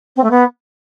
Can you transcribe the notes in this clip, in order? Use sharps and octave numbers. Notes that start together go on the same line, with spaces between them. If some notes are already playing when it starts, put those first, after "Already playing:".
C4
A3
B3